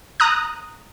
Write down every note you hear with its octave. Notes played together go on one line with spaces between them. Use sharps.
A#5 D#6 F#6